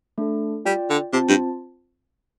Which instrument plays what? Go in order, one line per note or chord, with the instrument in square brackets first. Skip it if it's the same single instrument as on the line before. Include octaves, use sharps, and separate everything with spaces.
[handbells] A3 D4 A4
[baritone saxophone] G3 [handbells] F4 D5 G5
[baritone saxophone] D3
[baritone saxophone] C3 [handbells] C4 F4 C5 A5
[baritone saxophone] G2